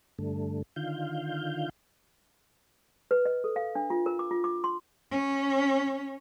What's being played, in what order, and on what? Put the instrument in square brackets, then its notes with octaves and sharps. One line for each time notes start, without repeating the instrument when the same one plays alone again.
[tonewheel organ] G2 D3 A3
D3 D#3 F4 F5 G6
[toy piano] B4
D#5
A4
F5
D4
F4
A#4
D6
F4
D6
C6
[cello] C#4